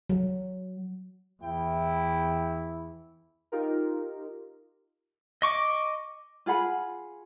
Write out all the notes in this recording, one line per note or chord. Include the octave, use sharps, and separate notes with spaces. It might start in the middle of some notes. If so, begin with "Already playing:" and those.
F#3
E2 E4 G5
D#4 F4 G4 A#4
D#5 C#6 D6
F4 G#4 F#5 B5